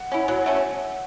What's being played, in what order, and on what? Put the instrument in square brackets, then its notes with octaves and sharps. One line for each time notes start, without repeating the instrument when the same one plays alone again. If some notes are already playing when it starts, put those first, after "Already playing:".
Already playing: [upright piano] F#5
[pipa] C#4 E4
[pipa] F#3 [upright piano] F#5
[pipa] A3 C#4